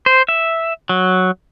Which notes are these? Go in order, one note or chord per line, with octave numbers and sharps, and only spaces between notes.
C5
E5
F#3